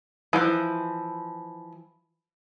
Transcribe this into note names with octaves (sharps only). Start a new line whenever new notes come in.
E3 F3